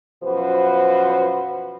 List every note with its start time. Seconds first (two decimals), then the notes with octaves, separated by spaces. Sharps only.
0.23 F#2 B2 F3 F#4 B4 C5